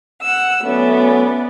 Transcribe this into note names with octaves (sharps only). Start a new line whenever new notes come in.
F#5 E6
F#3 A3 B3 C#4 D5